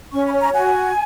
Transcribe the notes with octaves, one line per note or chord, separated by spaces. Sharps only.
C#4 C#6
B5
C#5
A#5
F#4 G#5